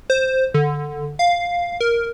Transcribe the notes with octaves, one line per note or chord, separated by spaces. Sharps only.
C5
D3
F5
A#4